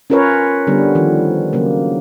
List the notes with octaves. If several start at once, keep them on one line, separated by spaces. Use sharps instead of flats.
C#4 F4 A#4 B4 C#5
D3 G3 B3
D#3 F3
C#3 F#3 A#3